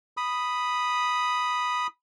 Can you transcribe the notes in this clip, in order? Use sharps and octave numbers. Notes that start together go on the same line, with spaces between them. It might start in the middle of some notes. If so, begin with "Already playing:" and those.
B5 D#6